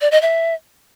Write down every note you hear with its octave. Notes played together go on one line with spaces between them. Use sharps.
D5
D#5
E5